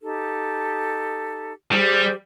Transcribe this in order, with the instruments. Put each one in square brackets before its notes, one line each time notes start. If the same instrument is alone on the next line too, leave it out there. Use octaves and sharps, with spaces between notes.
[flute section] D#4 G4 A4
[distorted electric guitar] G3 [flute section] G4 G#4 C5